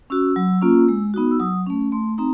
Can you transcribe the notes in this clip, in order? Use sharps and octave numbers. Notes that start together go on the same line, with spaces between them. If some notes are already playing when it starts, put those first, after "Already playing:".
C#4 F#4 E6
F#3
A#3 C#4 F4
G#3
B3 D#4 F#4
E6
F#3 D#6
A3 C#4
A3 C6
C4 D#4 A#5